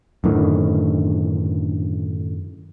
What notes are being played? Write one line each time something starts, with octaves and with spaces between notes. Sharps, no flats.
F#2 A2 D3 D#3